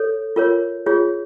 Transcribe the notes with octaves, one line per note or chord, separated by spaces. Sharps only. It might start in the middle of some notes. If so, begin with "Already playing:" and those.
Already playing: A4 C#5
F4 A#4 C#5
F4 G#4 C#5